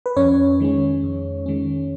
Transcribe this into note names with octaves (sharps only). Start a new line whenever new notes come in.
B4
F2 C#4 C#5
D#3 G#3 C#4
F2
D#3 G#3 C#4